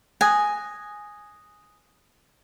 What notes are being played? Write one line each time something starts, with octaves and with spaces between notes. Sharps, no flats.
G#5 D#6 F#6 A#6